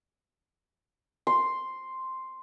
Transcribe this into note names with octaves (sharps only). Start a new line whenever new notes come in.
C6